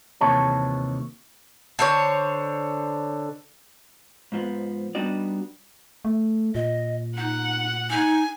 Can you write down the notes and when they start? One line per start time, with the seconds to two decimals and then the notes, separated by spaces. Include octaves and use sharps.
0.21 D#2 C3 E3 C#5 A5
1.79 D3 C5 C#5
4.32 G#2 F3 B3
4.95 G3 B3 D4 D#4 F#4 D5
6.05 A3
6.55 A#2 D#5
7.17 D#4 F#5
7.90 D#4 G#5